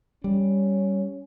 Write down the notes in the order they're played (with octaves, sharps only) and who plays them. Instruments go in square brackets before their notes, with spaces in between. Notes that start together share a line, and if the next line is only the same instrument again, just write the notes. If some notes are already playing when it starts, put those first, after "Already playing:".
[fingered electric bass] G3 [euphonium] C#4